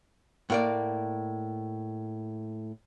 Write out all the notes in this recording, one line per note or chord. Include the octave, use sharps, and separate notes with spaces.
A2 A#3 D5